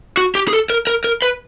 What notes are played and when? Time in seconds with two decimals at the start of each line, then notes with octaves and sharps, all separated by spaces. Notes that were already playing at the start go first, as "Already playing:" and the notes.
0.17 F#4
0.35 G4
0.48 G#4
0.53 A4
0.70 A#4
0.87 A#4
1.04 A#4
1.22 B4